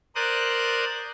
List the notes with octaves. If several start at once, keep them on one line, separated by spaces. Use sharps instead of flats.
A#4 C5 D5 D#6 F#6